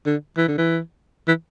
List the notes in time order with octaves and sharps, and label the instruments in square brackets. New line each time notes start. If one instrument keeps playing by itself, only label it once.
[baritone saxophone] D3
E3
D3
E3
E3